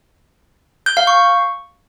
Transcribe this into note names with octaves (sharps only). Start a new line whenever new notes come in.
G6
F5
C#6